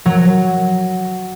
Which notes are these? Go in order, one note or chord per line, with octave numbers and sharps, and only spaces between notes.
F#3